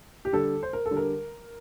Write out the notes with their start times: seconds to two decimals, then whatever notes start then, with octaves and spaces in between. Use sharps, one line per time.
0.25 G4
0.33 D3 G3 A4
0.63 C5
0.73 A#4
0.86 A4
0.91 D3 G3
0.97 A#4